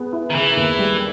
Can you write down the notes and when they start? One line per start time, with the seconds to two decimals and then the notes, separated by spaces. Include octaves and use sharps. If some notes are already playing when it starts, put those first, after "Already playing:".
Already playing: B3 G#4
0.13 E4
0.30 D#3
0.35 C#3 E3
0.57 D#2
0.79 G3